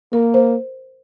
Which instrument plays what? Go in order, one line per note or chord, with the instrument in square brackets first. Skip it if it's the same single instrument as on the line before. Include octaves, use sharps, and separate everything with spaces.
[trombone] A#3 [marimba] A#4
[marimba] C5